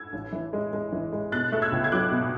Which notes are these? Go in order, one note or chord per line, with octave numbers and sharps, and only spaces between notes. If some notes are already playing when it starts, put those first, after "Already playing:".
Already playing: E6 G#6
A1
E3
G#3
G#3
E3
G#3
B2 F#6 A6
A3 F#6
E6 G#6
C#2
G#6
F#3 D6 F#6
B2